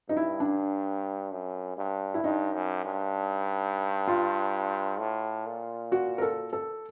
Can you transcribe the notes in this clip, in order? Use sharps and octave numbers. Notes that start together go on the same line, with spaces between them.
G2 D#4
E4
D4
F#2
G2
E4
G2 D#4
F#2
G2
F4
A2
A#2
F#4
A#4
A4
A4